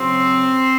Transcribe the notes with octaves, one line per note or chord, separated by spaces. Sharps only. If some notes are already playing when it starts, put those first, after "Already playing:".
Already playing: C#3 F#3 C4